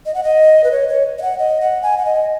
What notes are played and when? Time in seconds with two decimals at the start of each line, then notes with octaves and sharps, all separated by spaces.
0.06 D#5
0.14 F#5
0.23 D#5
0.64 B4
0.71 C#5
0.88 C#5
1.18 D#5
1.22 F#5
1.39 D#5
1.61 F#5
1.83 G#5
1.98 F#5
2.05 D#5